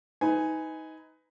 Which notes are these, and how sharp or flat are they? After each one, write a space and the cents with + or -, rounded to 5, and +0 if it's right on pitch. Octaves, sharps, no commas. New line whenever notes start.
D#4 +25 B4 +25 G#5 +0